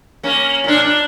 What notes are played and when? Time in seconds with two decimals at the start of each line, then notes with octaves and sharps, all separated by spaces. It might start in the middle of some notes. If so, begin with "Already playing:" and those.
0.23 A#3 C#4
0.64 A#2 D4
0.85 D4